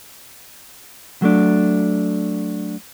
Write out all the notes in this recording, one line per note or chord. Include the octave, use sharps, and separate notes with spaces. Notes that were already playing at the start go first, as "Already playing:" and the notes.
F#3 A3 D4